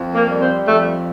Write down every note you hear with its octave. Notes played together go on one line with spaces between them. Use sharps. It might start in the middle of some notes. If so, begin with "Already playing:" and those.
Already playing: F2
A#3
G3
C4
F2 A3